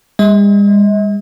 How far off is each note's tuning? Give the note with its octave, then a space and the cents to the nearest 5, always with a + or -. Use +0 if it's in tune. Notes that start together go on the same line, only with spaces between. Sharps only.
G#3 -45 D#5 +45